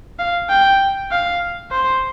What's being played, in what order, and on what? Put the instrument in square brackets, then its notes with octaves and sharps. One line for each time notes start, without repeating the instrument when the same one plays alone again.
[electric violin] F5
G5
F5
C5